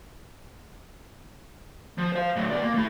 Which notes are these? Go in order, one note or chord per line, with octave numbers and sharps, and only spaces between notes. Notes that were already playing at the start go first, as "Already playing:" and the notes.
F3
C5 F5
A2 F#3
B3 D5
A#3
A3 E4